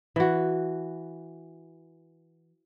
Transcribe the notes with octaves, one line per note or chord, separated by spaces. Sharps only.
E3 F#4